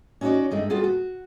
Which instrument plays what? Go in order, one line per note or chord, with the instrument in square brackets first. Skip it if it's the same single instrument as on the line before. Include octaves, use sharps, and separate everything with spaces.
[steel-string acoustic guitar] C#4 D#4 F#4 B4 C#5 D5
G2 G#3 A3 D#4
G3 B3 F4 F#4 G#4 A4
F#4